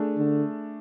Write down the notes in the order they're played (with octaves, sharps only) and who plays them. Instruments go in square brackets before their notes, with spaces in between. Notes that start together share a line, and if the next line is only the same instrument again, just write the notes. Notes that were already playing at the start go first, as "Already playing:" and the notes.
Already playing: [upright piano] A3 D4 G#4
[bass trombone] D3